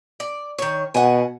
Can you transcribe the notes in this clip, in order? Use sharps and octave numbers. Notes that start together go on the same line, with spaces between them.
D5
D#3 C#5
B2 F#5 G#5